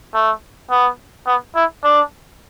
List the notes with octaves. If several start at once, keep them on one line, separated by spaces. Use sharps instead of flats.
A3
B3
B3
E4
D4